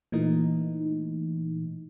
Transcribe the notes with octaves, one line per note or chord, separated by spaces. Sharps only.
A#2 E3 A3 D#4